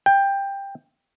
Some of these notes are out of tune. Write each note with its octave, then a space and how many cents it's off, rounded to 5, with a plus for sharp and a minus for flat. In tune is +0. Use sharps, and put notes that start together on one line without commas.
G5 +15